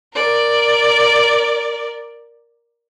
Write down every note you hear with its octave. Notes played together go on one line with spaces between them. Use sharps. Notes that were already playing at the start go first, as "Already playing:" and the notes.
A#4 D5